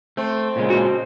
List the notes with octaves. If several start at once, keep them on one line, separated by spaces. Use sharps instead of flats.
A3 C4
A#2 C#3 G#3
F#4 D#5